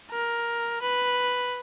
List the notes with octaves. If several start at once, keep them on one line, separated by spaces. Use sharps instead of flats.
A#4
B4